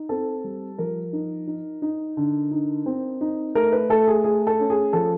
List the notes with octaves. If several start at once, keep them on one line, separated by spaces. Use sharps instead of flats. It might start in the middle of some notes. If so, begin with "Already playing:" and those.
Already playing: D#4
C4 A4
G3
F3 A#4
D#4
D#4
D#4
D3
D#4
C4
D#4
A3 A#4
B4
A3 A4
G#4
A3 G#4
A4
C#4
G#4
F3 A4